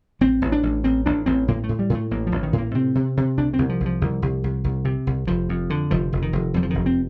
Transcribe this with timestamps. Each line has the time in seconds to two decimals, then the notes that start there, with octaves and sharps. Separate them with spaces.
0.21 A1 C4
0.42 A1
0.52 D4
0.63 A1
0.84 A1 C4
1.06 A1 D4
1.26 A1 C4
1.48 A2 A#3
1.64 A3
1.69 A2
1.79 G3
1.90 A2 A3
2.11 A1 A#3
2.27 F3
2.32 A1
2.43 D#3
2.53 A2
2.58 A#3
2.75 C3 C4
2.95 C3
3.17 C3
3.37 C2 D4
3.54 C2 C4
3.69 F3
3.80 C2
3.86 F3
4.01 C2
4.22 C2
4.44 C2
4.64 C2
4.85 C3
5.07 C2
5.27 F1 F3
5.49 F2
5.70 D3
5.91 F1 F3
6.13 F1
6.22 D#3
6.33 F1
6.54 F2 G3
6.63 F3
6.70 F1 D#3
6.86 C4